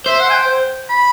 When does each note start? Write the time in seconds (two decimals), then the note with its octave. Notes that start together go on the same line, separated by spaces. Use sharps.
0.06 C5 E5
0.20 F#5
0.30 G#5
0.34 G5
0.90 B5